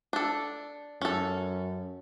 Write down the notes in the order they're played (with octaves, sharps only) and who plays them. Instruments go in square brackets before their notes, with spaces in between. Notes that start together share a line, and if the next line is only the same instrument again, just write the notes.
[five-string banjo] D4 A4
[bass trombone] F#2 [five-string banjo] C#4 A4